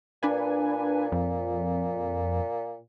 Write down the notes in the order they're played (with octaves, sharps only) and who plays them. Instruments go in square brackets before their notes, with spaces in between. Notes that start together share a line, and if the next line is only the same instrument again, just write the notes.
[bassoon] A#2 [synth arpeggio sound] D4 B4 G#5
[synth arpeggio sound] F2